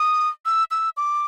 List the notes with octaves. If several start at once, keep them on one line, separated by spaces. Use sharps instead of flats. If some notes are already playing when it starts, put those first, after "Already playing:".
Already playing: D#6
E6
E6
D6